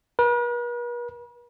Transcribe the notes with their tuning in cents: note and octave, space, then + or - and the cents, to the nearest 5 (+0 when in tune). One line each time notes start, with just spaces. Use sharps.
B4 -45